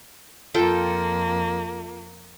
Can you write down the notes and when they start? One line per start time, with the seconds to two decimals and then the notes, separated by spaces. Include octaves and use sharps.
0.54 F2 A#3 F4 A4 G5